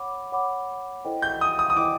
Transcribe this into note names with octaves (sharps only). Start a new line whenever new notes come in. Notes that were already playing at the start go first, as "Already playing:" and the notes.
Already playing: C#5 F#5 B5 D6
C#5 F#5 B5 D6
E4 A4 C5 D#5 G5
G6
D#6
D#6
D#6
E4 A4 C5 D#5 G5 D6